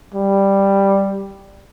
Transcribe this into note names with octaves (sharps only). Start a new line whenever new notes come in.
G3